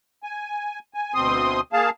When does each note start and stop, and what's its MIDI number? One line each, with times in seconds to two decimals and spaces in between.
0.23 0.79 80
0.94 1.14 80
1.14 1.61 38
1.14 1.61 47
1.14 1.61 60
1.14 1.61 84
1.14 1.61 87
1.73 1.90 58
1.73 1.90 68
1.73 1.90 77
1.73 1.90 81